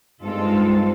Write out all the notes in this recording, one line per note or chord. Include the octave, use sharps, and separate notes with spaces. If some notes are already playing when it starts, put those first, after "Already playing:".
G2 G#3 C4 D#4 F4 A4